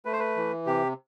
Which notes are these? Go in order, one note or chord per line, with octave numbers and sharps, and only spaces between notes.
A3 B4
C5
B4
E3
C3 G4